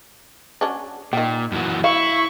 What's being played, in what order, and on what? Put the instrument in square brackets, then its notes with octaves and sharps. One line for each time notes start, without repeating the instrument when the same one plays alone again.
[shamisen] F#3 C#4 D4
[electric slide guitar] A#2 [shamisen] D#3 G5
[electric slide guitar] F#2 E3 F#4
[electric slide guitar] E4 [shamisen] F5 [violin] C#6